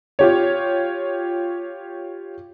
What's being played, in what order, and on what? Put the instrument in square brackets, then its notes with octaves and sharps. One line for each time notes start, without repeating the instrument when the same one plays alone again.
[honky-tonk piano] F4 G4 C#5